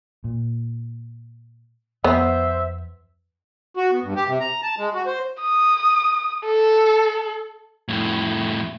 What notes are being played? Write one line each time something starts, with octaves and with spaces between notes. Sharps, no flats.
A#2
F2 B3 C5 E5
F#4
B3
G2
G4
C3
A#5
A5
G#3
F#4
C5
D#6
A4
F2 A2